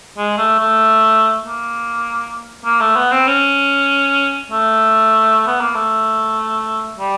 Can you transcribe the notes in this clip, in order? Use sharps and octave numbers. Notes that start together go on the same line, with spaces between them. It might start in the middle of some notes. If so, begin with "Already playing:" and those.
G#3
A3
A3
A#3
A#3
A3
B3
C4
C#4
A3
B3
A#3
A3
G3